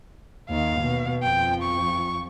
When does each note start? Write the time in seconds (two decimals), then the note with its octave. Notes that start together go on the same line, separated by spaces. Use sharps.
0.50 D#2 D#3 F5
0.81 B2
1.23 F2 F3 G5
1.62 C#6